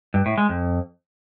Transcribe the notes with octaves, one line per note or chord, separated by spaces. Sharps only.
G2
A2
G#3
F2